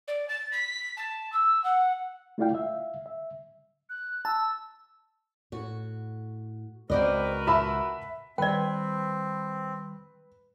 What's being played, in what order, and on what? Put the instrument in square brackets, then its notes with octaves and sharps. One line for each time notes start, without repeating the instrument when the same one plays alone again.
[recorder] D5
A6
B6
A5
E6
F#5
[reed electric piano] A3 E4 F4 D5 F5 G5
E5 F5
E5
[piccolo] F#6
[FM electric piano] A5 [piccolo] E6
[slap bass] A2 [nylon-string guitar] F#4
[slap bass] C#2 [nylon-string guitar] C4 D5 D#5 [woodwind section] F#4 A#4 B4
[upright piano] E5 B5 [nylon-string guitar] A5
[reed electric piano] D#3 G3 [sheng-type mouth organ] C4 [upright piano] B4 [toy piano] D5 G5